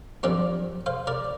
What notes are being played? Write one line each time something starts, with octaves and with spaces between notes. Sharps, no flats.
G2 F3 C4 A#4 D5
C5 F5
A#4 D5